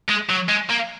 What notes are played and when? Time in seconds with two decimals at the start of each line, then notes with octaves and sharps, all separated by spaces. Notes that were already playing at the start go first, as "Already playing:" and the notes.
0.10 G#3
0.30 F#3
0.49 G#3
0.70 A#3